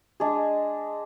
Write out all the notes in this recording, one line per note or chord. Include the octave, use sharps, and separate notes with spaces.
G#3 D4 G#4